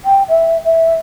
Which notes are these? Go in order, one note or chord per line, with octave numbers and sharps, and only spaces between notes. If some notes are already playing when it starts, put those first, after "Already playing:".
G5
E5
E5